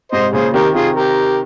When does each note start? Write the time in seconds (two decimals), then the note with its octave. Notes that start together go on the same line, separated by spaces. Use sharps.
0.12 G#2 C3 C5 D#5
0.33 A#2 C#3 G#4 C5
0.54 C3 D#3 G4 A#4
0.74 C3 D#3 F4 G#4
0.96 G4 A#4